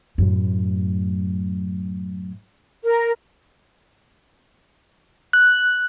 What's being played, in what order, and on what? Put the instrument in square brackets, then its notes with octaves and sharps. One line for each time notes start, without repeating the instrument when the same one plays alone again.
[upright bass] F#2 A2
[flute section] A#4
[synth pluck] F#6